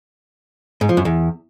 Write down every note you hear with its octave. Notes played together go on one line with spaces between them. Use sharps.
G#2
F3
F#2
E2